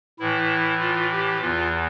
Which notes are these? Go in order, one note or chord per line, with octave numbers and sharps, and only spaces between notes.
A2 E3 E4
F4
G4
E2 E3 F4